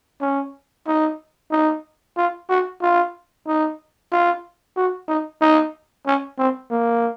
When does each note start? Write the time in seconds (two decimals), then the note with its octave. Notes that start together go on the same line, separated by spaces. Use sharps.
0.21 C#4
0.87 D#4
1.51 D#4
2.17 F4
2.49 F#4
2.82 F4
3.47 D#4
4.12 F4
4.77 F#4
5.08 D#4
5.41 D#4
6.06 C#4
6.38 C4
6.70 A#3